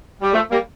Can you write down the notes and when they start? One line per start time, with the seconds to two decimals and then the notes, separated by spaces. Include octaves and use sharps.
0.21 G3
0.33 F3 A3
0.50 G3 A#3